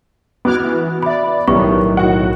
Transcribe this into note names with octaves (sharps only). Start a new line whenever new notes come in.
B3 F#4 D6 F6 F#6 G#6
E3
D5 E5 B5
B1 A2 D#3 G3 B3 C#6
F#4 F#5